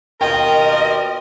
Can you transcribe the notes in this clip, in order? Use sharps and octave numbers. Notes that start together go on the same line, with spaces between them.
D#2 B2 F4 A#4 D#5 G5